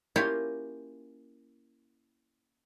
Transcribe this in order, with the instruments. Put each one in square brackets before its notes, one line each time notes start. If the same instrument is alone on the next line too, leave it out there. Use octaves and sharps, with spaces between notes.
[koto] A#3 C#4 E4 F4 G4